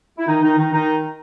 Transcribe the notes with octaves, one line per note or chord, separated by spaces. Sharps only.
E4
D#3 D#4
D#3 D#4
D#3 D#4
D#3 D#4